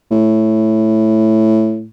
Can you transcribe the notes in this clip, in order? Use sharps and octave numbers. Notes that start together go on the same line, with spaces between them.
A2